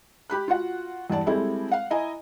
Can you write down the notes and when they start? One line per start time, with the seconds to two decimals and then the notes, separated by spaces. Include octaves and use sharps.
0.30 G4 B5 F#6
0.48 F4 F#4 F#5
1.10 E2 G2 D5 A5
1.26 G3 G#3 C4 E4 G#4 A4
1.72 F5 F#5
1.91 E4 D#5 G#5 A#5